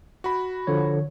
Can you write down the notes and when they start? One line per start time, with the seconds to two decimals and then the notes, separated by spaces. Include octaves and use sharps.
0.24 F#4 B5
0.67 D3 F3 C#5